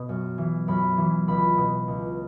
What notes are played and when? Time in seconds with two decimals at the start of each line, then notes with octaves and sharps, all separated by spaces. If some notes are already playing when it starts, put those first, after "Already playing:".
Already playing: B2
0.09 F#2
0.38 E3
0.68 F#2 B5
0.98 E3
1.28 C#2 B5
1.57 B2
1.88 C#2